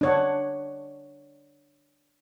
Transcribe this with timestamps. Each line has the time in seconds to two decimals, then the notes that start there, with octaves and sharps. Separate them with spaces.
0.01 D4 C#5 F#5